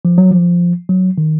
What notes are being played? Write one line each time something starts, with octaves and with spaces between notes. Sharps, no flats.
F3
F#3
F3
F#3
D#3